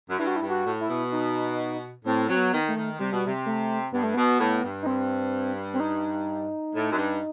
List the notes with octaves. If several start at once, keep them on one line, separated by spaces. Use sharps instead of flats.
F#2
G2 E4
F#4
E4
G2
F#4
A2
E4
B2
D#4
A2 C4
F#3 C4
B3
D#3
A3
D#3
C3 G3
B2
C3
A3
G2 B3
A3
B2 B3
A2
G2
D#4
C4
C4
D#4
A2
F#2
G2